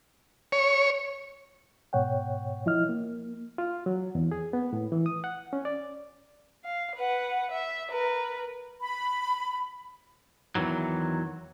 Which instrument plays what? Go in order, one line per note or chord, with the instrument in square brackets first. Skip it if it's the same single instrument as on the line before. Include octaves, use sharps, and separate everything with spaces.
[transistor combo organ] C#5
[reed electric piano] G#2 B2 C#5 F#5 G5
F3 E4 D#5 F6
A#3
F4
F#3
E2
G#4
B3
A2
E3
D#6
F#5
C#4
D5
[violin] F5
B4 F#5
E5
A#4 B4
[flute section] B5
[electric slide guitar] E2 G#2 D#3 E3 F#3